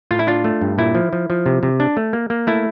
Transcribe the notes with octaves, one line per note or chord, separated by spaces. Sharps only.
A2 F4
E4
D4 F4
A3
G2
A#2 E4
F3
F3
F3
C3
C3
D4
A3
A#3
A#3
A3 E4